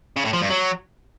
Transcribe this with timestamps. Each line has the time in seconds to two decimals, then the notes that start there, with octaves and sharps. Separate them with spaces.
0.17 C#3
0.25 A2
0.33 F3
0.42 G2
0.50 F#3